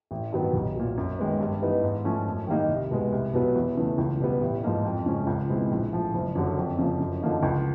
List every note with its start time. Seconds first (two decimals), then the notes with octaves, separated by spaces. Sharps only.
0.11 A1
0.32 G2 D#3 F#3 B3
0.53 B1
0.76 A#2 F#3
0.98 F#2
1.19 D#3 G#3 B3
1.41 G2
1.62 E3 G3 B3 D#4
1.83 G#2
2.04 F3 A3 C#4
2.26 F#2
2.47 D#3 G3 A#3 D#4
2.69 C2
2.91 B2 G#3 B3
3.12 C2
3.34 B2 F#3 B3
3.55 E2
3.78 C#3 E3 A3
3.98 C#2
4.20 B2 G3 B3
4.41 A1
4.63 G#2 F3 A#3 D#4
4.85 F2
5.06 C#3 F3 G#3 C#4
5.27 C#2
5.50 B2 G#3 C4 E4
5.71 A#1
5.93 A2 F3
6.14 F#1
6.35 F#2 D3 F#3
6.57 F2
6.79 C#3 F3 A#3
7.01 F#2
7.21 D3 F3 A#3 D#4
7.43 C#2